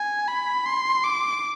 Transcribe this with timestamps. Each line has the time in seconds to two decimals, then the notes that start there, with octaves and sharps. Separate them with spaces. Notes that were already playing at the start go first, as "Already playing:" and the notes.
Already playing: G#5
0.28 B5
0.66 C6
1.04 D6